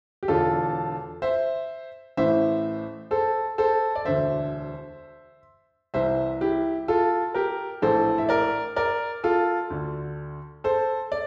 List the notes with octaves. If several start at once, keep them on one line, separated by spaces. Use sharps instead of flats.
G4
E1 E2 D3 F4 A4
C5 E5
A1 A2 E3 C5 E5
A4 C5
A4 C5
D5
E1 D2 D3 C5 E5
C2 C3 E3 C5 E5
E4 G4
F4 A4
G4 A#4
A#1 A2 E3 A4 C5
E5
A#4 D5
A#4 D5
F4 A4
D2 D3
A4 C5
D5